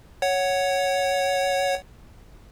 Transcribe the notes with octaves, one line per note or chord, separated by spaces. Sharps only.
C#5 F#5